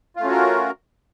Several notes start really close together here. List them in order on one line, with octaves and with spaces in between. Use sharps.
F4 A3 C#4 F#4 A#4